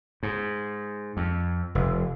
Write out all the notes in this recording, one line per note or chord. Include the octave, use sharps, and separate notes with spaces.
G#2
F2
F1